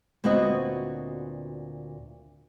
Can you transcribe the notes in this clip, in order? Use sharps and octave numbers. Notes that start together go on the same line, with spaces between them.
D2 A#2 B3 C4 F#4 D#5